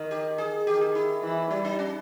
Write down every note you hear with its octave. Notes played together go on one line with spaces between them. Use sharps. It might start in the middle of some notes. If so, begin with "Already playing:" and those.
Already playing: D#3
G4
G#4
D#3 G4
G#4
E4
E3
G3 E4
D#4
C#4